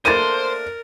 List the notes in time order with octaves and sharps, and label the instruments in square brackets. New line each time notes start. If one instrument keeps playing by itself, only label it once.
[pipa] A3 A#3 D4 [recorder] A#4 [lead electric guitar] C5 [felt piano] A6 D#7